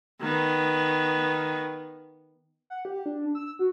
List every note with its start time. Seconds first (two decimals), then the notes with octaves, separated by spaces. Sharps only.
0.21 D#3 B3
2.70 F#5
2.85 G4
3.06 D4
3.35 E6
3.59 F#4